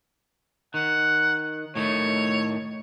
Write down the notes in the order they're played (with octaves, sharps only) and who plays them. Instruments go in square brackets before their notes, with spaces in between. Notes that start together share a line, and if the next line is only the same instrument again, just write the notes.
[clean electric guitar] D#3 [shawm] F#5
[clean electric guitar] A2 D#3 A3 [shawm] C#5